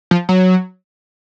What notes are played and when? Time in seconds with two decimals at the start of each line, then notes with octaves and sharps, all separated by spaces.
0.11 F3
0.29 F#3